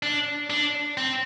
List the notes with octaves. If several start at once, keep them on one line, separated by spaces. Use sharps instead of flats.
D4
D4
C4